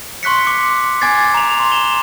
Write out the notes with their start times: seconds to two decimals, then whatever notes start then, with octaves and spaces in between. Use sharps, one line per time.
0.23 C6 C#6 F#6 B6 C#7
0.46 C6 D6 C#7
1.01 G#5 D6 G#6 A6 C7
1.34 A#5 F7
1.59 C6
1.72 E7 F7 G7